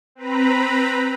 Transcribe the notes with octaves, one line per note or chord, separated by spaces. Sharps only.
C4 B4 A#5 B5